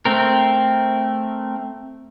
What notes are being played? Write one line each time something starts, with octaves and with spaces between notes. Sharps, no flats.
A3 C4 A#4